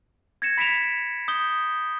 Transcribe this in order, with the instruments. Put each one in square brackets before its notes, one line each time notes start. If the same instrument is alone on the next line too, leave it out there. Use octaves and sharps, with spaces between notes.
[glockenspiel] G#6 A#6 C#7 E7
B5 B6 D7 E7 F7
D#6 G6 G7